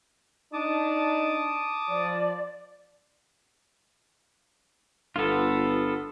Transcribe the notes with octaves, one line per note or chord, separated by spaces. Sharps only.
D4 D#4 A5 D6 D#6
F3 D5
G1 B3 F4 A4